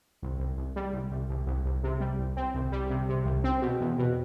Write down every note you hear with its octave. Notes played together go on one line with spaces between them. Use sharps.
C2
C2
C2
G3
C2
C2
C2
C2
C2
C3
G3
C2
C4
C2
G3
C3
C3
C2
C4
B2
E2
B2